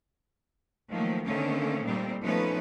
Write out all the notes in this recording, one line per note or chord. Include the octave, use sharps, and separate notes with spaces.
D#3 F3 F#3 A3 A#3
D3 D#3 A3 A#3 C4 C#4
A#2 D#3 G3 A3 A#3 C4
F3 A3 B3 C#4 D#4 B4